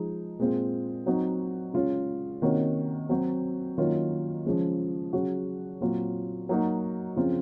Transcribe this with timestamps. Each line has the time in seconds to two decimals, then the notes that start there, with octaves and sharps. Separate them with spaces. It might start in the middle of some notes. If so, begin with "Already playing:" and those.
Already playing: F3 G#3 D#4
0.39 A#2 G#3 C4 F4
1.06 F#3 C4 D#4 F#4
1.74 C#3 G#3 C#4 F4
2.42 C3 D#3 A#3 C#4 F#4
3.09 F#3 C4 F#4
3.78 D#3 F#3 A#3 C#4 F4
4.46 C#3 F3 G#3 C#4
5.13 C#3 F#3 C#4 F#4
5.80 A#2 F#3 C4 F4
6.49 F#3 A#3 D#4 F#4
7.16 C#3 F3 C4 F4